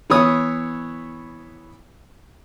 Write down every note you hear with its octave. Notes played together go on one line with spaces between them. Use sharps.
E3 B3 E4 C#5 D#6